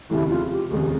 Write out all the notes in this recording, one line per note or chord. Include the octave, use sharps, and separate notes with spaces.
F1 D#2 C#3 E4
F4
G4
F1 D#2 C#3 G#4